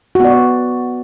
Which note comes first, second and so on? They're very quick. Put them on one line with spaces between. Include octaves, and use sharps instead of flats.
F#4 B3 D5